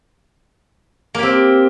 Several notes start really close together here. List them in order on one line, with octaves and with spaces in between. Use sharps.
A#3 G4 C4